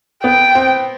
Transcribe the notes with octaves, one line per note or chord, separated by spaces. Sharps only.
B3 G5
C4